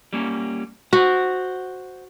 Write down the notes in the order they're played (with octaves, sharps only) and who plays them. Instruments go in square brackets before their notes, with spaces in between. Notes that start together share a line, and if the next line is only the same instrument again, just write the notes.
[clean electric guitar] G3 A#3 C#4
[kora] F#4 [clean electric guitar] C5 F#5